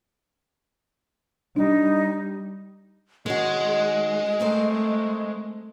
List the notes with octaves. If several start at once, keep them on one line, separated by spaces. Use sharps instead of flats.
G3 D4 D#4
D#3 G#3 C#4 F#4 D#5
A3 C4 A#4 C5